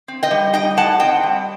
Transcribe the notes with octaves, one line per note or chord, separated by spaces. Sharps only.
C4
D#5 G5
G3
D#4 D#5 G5
A2 F#5 A5
C4 D#5 G5
G3